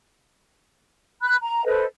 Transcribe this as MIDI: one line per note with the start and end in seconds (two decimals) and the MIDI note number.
1.23 1.36 83
1.23 1.36 90
1.41 1.64 82
1.65 1.85 69
1.65 1.85 71
1.65 1.85 72
1.65 1.85 75